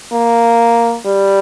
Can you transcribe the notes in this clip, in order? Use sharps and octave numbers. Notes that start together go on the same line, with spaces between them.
A#3
G3